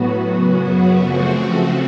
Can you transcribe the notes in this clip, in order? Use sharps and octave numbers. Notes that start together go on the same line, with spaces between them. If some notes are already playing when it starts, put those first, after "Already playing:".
Already playing: A2 F#3 B3 F#4
F#2 C#3 F#3 B3
C#3 F3 A3 C4